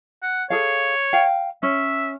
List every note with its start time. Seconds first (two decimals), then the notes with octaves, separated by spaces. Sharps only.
0.23 F#5
0.50 G#4 A4 C#5 F5
1.13 F5 G5
1.63 C#4 E5